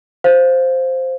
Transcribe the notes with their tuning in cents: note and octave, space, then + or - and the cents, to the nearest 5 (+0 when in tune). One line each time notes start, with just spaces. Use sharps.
C5 +0 F5 +0